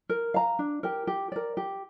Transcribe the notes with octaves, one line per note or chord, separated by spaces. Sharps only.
A#4
F5 A#5
D4
G4 A#4 G5
G4
A#4 D5
G4